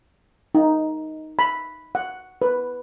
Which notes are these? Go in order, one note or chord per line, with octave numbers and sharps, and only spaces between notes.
D#4
B5
F#5
B4